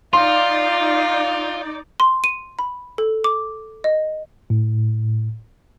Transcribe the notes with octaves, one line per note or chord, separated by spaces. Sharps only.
D#4 F4 D5 F5 C6
C6
D#7
B5
A4
D6
D#5
A2